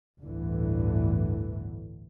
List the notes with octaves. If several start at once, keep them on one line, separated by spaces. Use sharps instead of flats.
G1 D2 A2 D3 E3